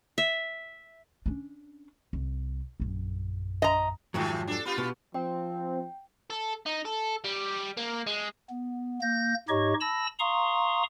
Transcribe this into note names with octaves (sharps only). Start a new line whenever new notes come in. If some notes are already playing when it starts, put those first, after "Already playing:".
E5
C#4 D4
C2
A#1 F#2
D#5 A#5
F2 G#2 C3 D#3 F#3 A3
D4 A4
B3 F4 G4
B2
F3 C4 G5
A4
D#4
A4
G3
A#3
G#3
B3
A#3 G6 A#6
G#2 D#4 G4 C#5 D#5 C#6
A5 B5 E6 A#6
F5 A#5 C6 C#6 D#6